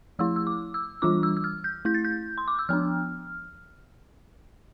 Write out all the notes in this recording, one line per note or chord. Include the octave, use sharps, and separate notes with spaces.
F3 A3 E4 E6
E6
D6
E6
E3 G3 D4 F4 D6
E6
E6
F6
G6
A3 E4 G6
A6
G6
C6
D6
E6
F3 B3 D4 F6